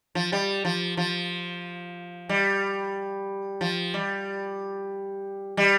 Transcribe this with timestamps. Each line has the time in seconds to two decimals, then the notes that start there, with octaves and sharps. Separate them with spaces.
0.15 F3
0.32 G3
0.65 F3
0.97 F3
2.29 G3
3.61 F3
3.94 G3
5.57 G3